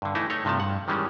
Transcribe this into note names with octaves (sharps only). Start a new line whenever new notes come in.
G2 D3
E3 A3 D#4 E4
A3 D#4 C#5
G2 C3 F3 A3 A5
G2 F#5
D#3 E3 G3 G#3 C#4